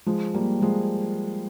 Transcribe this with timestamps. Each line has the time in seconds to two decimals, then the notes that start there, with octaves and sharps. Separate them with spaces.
0.06 F3 G#3
0.34 G3 A#3
0.62 F3 G#3